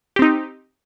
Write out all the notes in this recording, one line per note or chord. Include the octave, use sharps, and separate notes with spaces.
C4 D#4 G4